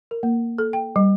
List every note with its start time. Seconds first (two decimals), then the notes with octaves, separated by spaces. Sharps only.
0.11 A#4
0.23 A#3
0.58 A4
0.73 G5
0.96 G3